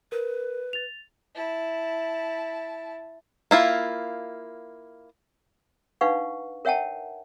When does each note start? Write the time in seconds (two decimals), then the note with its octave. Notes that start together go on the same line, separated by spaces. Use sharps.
0.12 A#4 B4
0.73 A6 F7
1.35 E4 A5
3.51 A#3 E4 F4
6.01 D4 D#4 B4 F5 F#5 C#6
6.65 A#4 C#5 E5 F#5 G5 A5